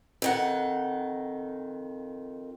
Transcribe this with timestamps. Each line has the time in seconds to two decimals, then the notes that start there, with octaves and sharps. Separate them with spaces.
0.22 F2 D#3 F#5